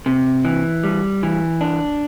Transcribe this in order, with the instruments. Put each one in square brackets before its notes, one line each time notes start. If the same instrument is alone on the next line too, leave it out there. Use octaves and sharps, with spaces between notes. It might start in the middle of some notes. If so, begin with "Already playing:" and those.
[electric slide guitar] C3
E3
G3
E3
D4